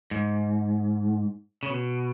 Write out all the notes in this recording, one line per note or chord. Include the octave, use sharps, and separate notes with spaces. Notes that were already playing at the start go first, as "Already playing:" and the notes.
G#2
C#3
B2